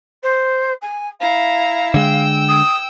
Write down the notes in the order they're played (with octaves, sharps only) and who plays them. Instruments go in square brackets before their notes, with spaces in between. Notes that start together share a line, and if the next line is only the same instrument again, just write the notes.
[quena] C5
G#5
[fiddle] E4 A#5 [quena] F5
[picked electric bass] D3 G#3 [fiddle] G5 E6
[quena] D#6